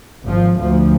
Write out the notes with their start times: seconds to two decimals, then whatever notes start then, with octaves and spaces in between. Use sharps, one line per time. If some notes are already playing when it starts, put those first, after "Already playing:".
0.25 G#1 F3
0.60 D2 F3